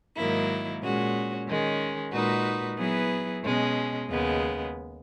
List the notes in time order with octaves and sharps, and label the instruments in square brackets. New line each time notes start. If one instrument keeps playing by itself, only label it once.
[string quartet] G#2 D#3 F#3 A#3 E4
A#2 G#3 C#4 F#4
D#3 G#3 C#4
A#2 G#3 D#4 F#4 B4
F#3 B3 E4 G#4 B4
B2 G#3 C#4
D#2 C#3 G#3 B3